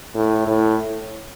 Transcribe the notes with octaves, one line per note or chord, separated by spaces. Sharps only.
A2
A2